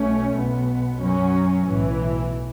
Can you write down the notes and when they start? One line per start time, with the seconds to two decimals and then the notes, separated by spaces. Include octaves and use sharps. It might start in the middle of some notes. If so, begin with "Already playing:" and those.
Already playing: B1 B2 A3 C#4
0.34 B1 B2 B3
0.99 F#2 F#3 C#4
1.63 B1 A2 E3